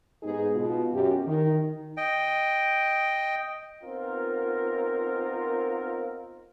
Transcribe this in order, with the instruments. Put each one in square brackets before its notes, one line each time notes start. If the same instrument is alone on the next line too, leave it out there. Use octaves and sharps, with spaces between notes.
[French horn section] G#2 B3 D#4 G#4
B2 F4
F#2 G4
D#3
[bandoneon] D#5 G5
[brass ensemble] B3 C4 D#4 F4 A#4